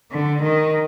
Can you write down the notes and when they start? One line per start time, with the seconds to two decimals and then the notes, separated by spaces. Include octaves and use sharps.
0.12 D3
0.43 D#3